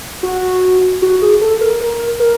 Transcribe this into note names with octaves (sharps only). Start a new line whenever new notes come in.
F#4
F#4
G#4
A4
A#4
A#4
A#4